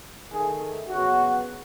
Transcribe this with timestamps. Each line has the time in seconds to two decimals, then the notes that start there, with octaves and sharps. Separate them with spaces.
0.31 D#3 A3 G#4
0.88 C#3 F#3 B3 F#4